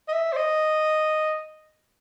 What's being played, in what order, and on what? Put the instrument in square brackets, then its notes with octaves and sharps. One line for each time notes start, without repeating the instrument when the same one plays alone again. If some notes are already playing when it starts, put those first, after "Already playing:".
[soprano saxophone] D#5
E5
C5
D#5